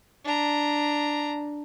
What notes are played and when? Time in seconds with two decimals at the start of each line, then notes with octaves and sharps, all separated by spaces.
0.24 D4 A#5